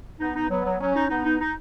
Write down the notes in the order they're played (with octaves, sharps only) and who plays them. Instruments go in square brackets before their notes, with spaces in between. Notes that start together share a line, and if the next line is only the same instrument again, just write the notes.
[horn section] B3 [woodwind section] D#4
[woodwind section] D#4
[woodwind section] F#3 [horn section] B3
[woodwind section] F#3
[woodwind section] F#3 [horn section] C#4
[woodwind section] D#4
[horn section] B3 [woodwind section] D#4
[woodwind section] D#4
D#4